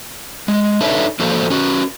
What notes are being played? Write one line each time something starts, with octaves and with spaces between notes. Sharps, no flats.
G#3
D4 D#4 A4 B4 C#5 E5
F3 A#3 F#4 A4 C5
C#4 F#4 B4